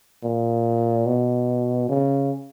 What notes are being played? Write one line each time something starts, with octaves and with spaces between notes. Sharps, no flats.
A#2
B2
C#3